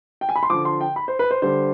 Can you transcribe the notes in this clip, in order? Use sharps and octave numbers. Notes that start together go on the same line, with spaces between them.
G5
G#5
B5
C6
D3 F3 D6
C6
G5
B5
C5
B4
C5
D3 G3 C5